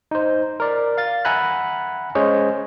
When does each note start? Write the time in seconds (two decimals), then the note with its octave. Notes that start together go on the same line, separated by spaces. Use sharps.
0.11 D#4 C5
0.60 A#4 D5
0.98 F5 A6
1.25 E5 F#5 G#5 A#5 B5 F#6
2.15 G#3 C#4 C5 C#5 D#5